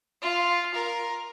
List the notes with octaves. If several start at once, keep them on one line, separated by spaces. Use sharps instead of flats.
F4
A#4